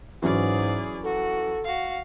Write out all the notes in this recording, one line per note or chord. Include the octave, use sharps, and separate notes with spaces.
G#2 E3 F#3 C#4 G#4 D5
F#4 A4
F#4 F5